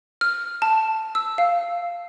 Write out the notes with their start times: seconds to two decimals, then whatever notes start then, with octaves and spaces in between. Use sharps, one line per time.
0.21 F6
0.62 A5
1.15 E6
1.38 F5